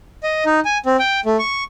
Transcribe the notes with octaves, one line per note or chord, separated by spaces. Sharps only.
D#5
D#4
G#5
C4
G5
A3
C#6